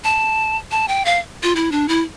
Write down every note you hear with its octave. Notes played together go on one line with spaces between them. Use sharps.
A5
A5
G5
F5
F4
E4
D4
E4